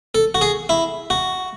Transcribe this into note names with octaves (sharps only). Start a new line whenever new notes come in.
A4
F#4
G#4
E4
F#4